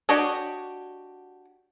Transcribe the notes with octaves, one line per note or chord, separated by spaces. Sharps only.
D4 F#4 G4 C#5 D#5